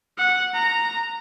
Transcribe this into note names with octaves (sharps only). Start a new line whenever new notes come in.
F#5
A#5